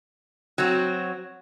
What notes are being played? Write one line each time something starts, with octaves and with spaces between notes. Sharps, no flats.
F#3 C4 F#4